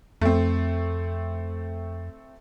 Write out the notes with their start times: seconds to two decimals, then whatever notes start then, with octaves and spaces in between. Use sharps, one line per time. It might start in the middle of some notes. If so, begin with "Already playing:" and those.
0.22 F2 A3 C4